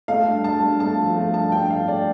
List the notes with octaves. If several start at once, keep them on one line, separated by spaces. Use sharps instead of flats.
A3 F5
G2
G2 A5
G2
A3 A5
F3
A3
G2 A5
G2 G5
A3 F5
A3 D5